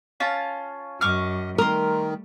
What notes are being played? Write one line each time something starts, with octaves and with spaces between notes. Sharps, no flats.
C#4 F4 A5
F#2 D#5 C#6 D6 F6
D#3 G3 A3 A#4 C6 D#6